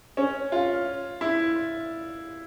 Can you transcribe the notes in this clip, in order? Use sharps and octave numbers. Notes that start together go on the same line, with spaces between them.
C#4
F4
E4